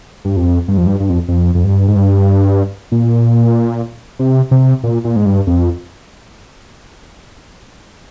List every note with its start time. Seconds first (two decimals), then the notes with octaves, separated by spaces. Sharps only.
0.25 G2
0.37 F2
0.68 G2
0.77 F2
0.86 G2
1.00 G2
1.10 F2
1.28 F2
1.55 F2
1.64 G2
1.88 G#2
1.96 G2
2.92 A#2
4.19 C3
4.51 C3
4.84 A#2
5.05 A#2
5.16 G#2
5.26 G2
5.47 F2